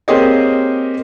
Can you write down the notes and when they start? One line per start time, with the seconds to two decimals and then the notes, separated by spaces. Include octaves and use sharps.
0.08 A#3 C4 G4 G#4 C#5 D#5